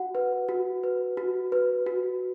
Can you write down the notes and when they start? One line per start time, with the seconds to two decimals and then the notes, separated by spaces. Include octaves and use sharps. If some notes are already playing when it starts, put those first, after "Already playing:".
Already playing: F#4 F#5
0.15 B4
0.49 F#4
0.83 B4
1.17 F#4
1.52 B4
1.86 F#4